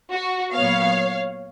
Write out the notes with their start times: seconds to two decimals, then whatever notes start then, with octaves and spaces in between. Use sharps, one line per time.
0.11 F#4
0.54 A#2 F#3 B3 C#5 F5